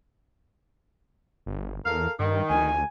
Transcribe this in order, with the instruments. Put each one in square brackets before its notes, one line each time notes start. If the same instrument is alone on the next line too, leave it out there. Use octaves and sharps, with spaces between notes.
[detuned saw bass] G1
[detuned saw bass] E2 [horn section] A4 A#4 F5
[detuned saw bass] G2 [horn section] D#3
[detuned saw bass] D2 [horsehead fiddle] G#5